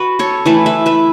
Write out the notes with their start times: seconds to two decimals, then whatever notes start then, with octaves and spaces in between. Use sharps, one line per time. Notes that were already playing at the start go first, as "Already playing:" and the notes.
Already playing: F#4 B4
0.19 A4 C#5
0.46 E3 A3 B4 E5
0.66 B4 E5
0.86 B4 E5